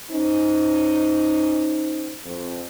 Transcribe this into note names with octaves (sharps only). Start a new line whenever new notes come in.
C#4 D#4 C5
F2